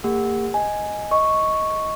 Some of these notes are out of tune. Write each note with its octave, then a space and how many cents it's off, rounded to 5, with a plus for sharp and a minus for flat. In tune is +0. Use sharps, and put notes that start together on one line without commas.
A#3 -35 G4 +45 F#5 +0
D#5 +0 G#5 +0
D#5 +10 C#6 +0